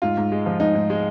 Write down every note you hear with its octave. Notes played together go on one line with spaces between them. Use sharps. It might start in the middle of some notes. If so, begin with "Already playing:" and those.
G#2 F4
G#2
G#3
F3
G#2 D#4
G#2
G#3